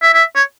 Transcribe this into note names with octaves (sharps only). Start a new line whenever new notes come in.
E5
E5
C#5